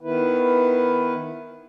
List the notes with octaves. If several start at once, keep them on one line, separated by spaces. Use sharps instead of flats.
D#3 B3 E4 B4